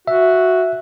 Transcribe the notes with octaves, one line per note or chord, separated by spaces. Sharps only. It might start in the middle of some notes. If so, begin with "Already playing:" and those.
F#4 E5